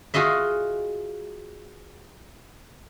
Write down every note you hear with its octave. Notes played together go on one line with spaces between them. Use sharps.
F4 F#4 G#4 D#5 E5